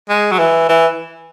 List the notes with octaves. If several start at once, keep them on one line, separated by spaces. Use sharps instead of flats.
G#3
F#3
E3
E3